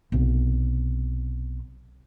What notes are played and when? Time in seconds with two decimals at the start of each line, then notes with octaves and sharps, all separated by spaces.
0.12 B1 C3